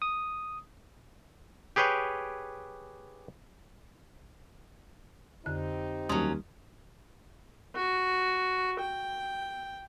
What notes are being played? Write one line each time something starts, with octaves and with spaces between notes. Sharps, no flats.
D#6
G4 G#4 B4 C#5 G5
F2 D3 C4 D#4 G4 F#6
D#2 F#3 G3 C#4 C6 D#6
F#4
G5